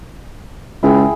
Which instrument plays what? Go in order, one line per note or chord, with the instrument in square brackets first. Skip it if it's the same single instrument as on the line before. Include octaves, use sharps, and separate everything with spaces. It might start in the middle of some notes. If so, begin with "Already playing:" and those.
[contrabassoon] C#2 [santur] E4 G#4 G5